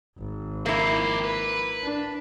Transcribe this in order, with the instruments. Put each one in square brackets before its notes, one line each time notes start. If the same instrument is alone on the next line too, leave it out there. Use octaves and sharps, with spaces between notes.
[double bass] G#1
[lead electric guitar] F2 G4 [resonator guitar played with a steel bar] A#3 E4
[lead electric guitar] B4 B5
[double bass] D4